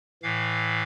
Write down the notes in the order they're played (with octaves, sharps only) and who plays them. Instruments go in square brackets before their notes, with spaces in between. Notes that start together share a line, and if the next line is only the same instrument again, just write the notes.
[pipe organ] A2 E3 F5